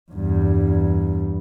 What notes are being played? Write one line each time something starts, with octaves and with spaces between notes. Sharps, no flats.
E2 G2